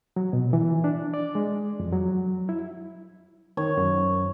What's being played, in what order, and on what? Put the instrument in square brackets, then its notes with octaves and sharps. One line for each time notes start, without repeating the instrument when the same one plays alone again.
[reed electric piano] F#3
B2
E3
D4
D5
G#3
F2
F#3
E4
[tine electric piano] D#3 [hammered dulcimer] C#5
[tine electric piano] F#2